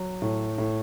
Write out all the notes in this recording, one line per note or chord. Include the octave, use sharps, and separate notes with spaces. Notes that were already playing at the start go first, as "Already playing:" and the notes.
Already playing: F#3
A2
A2